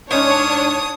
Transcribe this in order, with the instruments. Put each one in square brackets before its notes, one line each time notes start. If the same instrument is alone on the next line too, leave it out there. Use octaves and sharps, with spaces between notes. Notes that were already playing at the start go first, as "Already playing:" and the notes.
[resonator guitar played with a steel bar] G#2 C#4 [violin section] D4 C#5 [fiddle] D#6